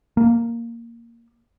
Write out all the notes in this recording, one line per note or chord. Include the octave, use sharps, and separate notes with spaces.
A#3